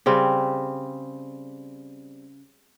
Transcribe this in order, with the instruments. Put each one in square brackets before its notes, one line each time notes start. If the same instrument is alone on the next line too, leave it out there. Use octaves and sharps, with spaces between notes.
[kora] C#3 G3 C4